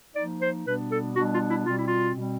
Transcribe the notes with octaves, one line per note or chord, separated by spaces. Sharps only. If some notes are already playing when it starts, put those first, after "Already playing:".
F3 A#3 D#4 D5
C5
B2 G3 B3 D4 B4
A4
B2 G3 B3 D4 F#4
F4
E4
B2 G3 C4 F4
E4
F4
B2 G3 C4